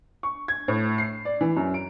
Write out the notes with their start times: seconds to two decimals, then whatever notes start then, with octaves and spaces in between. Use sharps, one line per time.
0.23 C#6
0.48 G#6
0.68 A2
0.98 C7
1.25 D5
1.41 E3
1.57 F#2
1.74 D7